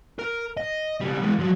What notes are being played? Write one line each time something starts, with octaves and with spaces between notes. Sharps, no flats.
A#4
D#5
C#2 G3
E3 G#3
F3 F#3